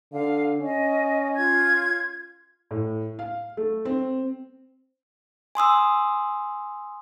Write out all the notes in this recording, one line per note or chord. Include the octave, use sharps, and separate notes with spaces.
D3 F5
C#4 D#5
F4 G#6
A2
F5
A3
C4
G#5 C6 D#6 E6